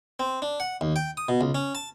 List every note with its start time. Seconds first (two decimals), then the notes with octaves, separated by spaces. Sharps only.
0.20 C4
0.42 D4
0.60 F#5
0.81 D#2
0.96 G5
1.17 D#6
1.29 B2
1.41 C#2
1.55 C#4
1.75 A5